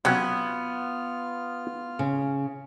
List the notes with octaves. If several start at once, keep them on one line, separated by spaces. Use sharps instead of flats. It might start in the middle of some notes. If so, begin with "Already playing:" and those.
C3 F#3 B3 C#4 F4 F6
C#3